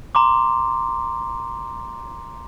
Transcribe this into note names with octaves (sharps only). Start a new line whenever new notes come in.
A#5 C6 D6